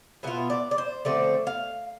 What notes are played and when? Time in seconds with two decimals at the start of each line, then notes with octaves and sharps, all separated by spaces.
0.23 B2 B3 F4 E5
0.50 D5
0.71 D5
0.78 C5
1.05 D3 F3 A3 C4 D5
1.47 F5